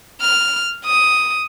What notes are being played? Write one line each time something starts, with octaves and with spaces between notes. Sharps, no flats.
F6
D#6